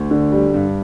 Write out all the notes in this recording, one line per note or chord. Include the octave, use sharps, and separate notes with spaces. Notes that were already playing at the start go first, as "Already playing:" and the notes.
Already playing: D2
D3
G3
G2